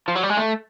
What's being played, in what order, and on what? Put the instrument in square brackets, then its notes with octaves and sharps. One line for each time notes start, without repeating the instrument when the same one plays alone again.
[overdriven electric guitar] F3
F#3
G3
G#3
A3